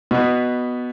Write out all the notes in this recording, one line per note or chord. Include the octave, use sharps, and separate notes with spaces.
B2 B3